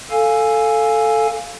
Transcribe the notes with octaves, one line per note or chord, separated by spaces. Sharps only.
A4 F5 G#5